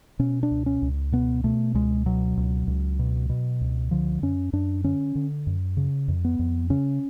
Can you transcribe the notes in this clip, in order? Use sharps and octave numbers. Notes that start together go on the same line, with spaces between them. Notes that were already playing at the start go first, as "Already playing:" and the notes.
B2 C#4
D4
C#2
C#4
C#2
B2 B3
B2 A3
C#2 G#3
B2 F#3
C#2
C#2
B2
B2
C#2
D3 F3
F#2 C#4
F#2 D4
D3 C#4
D3
F#2
C#3
F2
B3
F2
C#3 C#4